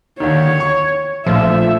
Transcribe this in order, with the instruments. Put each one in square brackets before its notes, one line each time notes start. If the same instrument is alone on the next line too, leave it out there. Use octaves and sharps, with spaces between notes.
[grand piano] D#2 D3 D#3 [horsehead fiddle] C#5
[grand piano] C#6
[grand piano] A#1 A3 [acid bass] F3 [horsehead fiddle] E5